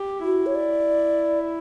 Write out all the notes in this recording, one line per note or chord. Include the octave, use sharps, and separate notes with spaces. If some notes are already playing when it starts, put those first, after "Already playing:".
Already playing: G4
E4 F#4
C#5
D5